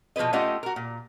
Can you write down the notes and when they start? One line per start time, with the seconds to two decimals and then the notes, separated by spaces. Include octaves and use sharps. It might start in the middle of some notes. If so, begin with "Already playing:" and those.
0.16 B2 F3 G#4 B4 D#5
0.33 A3 C#4 F4 G4 D#5 F#5
0.63 F#4 A#4
0.76 A#2